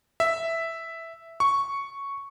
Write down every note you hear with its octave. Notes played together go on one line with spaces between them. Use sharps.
E5
C#6